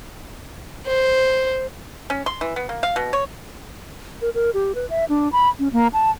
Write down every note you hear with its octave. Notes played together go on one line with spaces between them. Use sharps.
C5
C#4
C6
E3
B3
A#3
F5
B2
C#5
A#4
A#4
G4
B4
E5
D4
B5
C#4
A#3
A5